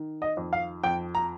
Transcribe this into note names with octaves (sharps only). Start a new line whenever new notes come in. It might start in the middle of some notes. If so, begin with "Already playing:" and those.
Already playing: D#3
D#5
F2
F5
F2 G5
A#5